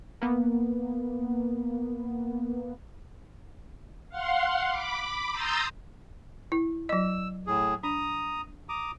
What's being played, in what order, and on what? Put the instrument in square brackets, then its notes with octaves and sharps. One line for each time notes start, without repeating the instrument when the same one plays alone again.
[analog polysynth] A#3 B3
[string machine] F5 F#5 C6
B5 D6
A#5 C6 D#6 E6 G6 A6
[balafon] E4
[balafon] F#3 D#5 [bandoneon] E6
[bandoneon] A2 G#4
[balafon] D4 [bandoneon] A#5 D#6
[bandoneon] A#5 D6 D#6